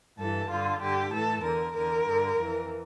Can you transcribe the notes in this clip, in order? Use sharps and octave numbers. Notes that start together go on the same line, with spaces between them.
G2 E3 A4
G2 D3 F4
G2 D3 G4
A2 E3 A4
E2 D3 A#4
E2 D3 A#4
G2 D3
F2 E3